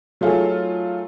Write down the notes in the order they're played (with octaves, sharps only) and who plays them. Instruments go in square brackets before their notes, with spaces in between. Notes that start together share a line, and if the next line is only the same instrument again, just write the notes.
[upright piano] F#3 A3 D#4 F4 G#4 A4